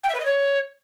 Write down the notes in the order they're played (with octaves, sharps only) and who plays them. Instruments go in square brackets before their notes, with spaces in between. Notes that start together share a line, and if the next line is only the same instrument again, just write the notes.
[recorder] G5
E5
B4
D#5
C#5